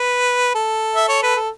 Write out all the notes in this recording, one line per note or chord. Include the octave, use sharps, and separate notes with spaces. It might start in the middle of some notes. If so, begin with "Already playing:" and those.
Already playing: B4
A4
E5
C#5
B4
A4